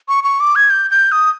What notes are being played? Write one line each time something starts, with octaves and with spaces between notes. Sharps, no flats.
C#6
C#6
D6
G#6
G6
G6
D#6